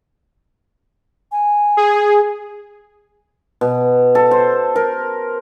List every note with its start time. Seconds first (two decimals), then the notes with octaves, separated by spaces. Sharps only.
1.32 G#5
1.77 G#4
3.61 B2
4.15 A4
4.31 C5
4.76 A#4